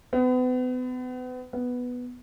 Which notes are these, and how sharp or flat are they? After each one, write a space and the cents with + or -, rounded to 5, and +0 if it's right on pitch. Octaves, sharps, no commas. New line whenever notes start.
B3 +35
B3 +0